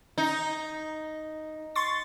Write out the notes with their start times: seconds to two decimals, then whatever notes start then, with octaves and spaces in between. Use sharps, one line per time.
0.18 D#4
1.75 C6 C#6 A6